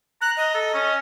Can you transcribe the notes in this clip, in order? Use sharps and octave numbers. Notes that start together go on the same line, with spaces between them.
A#5 F#6
D#5
A4
C#4